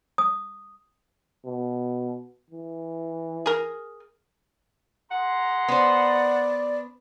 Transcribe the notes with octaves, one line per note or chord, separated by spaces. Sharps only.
D#6
B2
E3
G#4 A#4
G#4 F#5 A#5 C6
B3 C5 D5